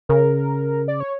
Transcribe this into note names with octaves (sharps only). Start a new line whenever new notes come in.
C#3 A#4
D5
C#5